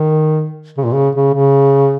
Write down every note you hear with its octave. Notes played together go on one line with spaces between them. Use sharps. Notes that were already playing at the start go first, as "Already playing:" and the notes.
Already playing: D#3
C#3
A#2
C#3
C#3
C#3